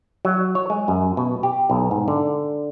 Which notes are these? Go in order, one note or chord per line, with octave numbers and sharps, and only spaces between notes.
F#3
C#5
G#3
F#2
B2
G4
B1
G#2
D3